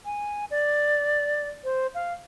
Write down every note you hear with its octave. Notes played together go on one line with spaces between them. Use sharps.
G#5
D5
C5
F5